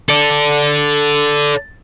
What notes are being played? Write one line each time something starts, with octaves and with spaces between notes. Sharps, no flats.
A4 D5